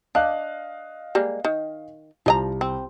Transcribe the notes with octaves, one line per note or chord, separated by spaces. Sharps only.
D4 D#5 F5 F#6
G3 G#3 A#3
D#3
C2 F3 D#5 A#5
C4